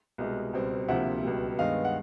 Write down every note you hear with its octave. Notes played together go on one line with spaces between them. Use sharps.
C2 B2 G#3
C#2 B2 G3 C4
D2 C3 F3 A#3 E5 F#5
C#2 B2 G3
G2 D#3 G#3 B3 D#5 F5
F#5